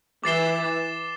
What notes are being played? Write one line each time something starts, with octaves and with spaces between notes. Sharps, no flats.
E3 D6 A6 C7 E7 G7